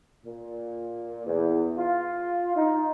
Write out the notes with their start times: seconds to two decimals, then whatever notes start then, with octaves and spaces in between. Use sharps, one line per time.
0.25 A#2
1.26 E2
1.78 F4
2.56 D#4